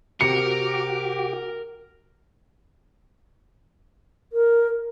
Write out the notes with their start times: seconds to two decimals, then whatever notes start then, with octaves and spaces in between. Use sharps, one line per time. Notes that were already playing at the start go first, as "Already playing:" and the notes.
0.21 C3 F#4 G4 A#4 D6 C#7
4.32 A#4